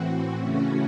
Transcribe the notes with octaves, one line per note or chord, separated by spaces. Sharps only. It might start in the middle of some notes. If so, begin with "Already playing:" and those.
Already playing: A2 E3 C4 F#4
C#3 E3 A3 C#4 F#4